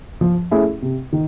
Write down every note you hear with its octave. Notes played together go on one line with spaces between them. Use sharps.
F3
A3 C#4 E4 G#4
C3
D#3